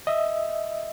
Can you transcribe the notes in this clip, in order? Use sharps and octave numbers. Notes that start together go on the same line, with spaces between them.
D#5 E5